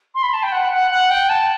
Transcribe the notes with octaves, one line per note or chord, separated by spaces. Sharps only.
C6
B5
A5
G5
F#5
F#5
F#5
G5
A5